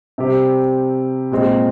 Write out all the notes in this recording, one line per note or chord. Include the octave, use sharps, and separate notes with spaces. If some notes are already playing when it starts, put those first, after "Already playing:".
C3 G3 C4 G4 C5
A#2 G#3 C4